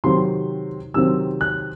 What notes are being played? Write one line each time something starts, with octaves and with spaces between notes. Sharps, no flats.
C3 D#3 F#3 C4 C6
C3 D#3 F#3 C4 E6
F#6